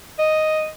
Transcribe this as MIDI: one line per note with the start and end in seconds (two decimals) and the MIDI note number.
0.19 0.68 75